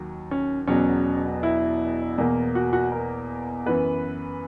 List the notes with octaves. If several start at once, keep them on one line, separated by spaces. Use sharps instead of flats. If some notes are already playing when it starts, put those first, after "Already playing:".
Already playing: D#2 D#3 F#3
C#4
E1 E2 B2 F#3 C#4
E4
E2 B2 A#3
F#4
F#4
A#4
F#2 E3 B3 B4